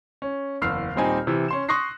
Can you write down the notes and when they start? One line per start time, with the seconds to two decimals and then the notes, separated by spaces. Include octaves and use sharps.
0.22 C#4
0.62 F#1 E2 E6 F6 C7
0.95 D#1 A#2 G3 C4 D#4 G#5
1.27 C3 E3
1.48 C#4 C6 E7
1.69 C6 C#6 D#6 F#6 A#6 C7